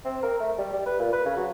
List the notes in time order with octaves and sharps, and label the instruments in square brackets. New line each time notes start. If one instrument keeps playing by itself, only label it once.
[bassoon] C4
A#4
A3
G3
G3
B4
A#2
B4
C#3
F#3